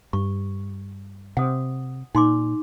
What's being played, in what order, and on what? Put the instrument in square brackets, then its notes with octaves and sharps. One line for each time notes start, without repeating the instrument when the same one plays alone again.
[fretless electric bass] G2 [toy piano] C#6
[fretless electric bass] C3 [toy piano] F#5 D#6
[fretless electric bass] A#2 [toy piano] D#4 C6 D6